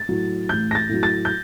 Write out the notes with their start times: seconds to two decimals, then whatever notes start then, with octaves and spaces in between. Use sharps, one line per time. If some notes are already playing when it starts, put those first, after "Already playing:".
Already playing: A6
0.09 A2 F#3
0.49 A1 G6
0.71 A#6
0.75 A6
0.89 A2 F#3
1.03 A6
1.25 G6